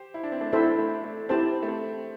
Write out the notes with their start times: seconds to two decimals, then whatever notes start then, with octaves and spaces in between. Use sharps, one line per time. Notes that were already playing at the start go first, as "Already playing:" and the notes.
Already playing: G4 C5
0.14 E4
0.24 D4
0.32 C4
0.41 A3 D4
0.52 C4 E4 A4 C5 E5
0.78 A3
1.04 A3
1.29 C4 E4 G4 C5 A5
1.63 A3
1.68 C4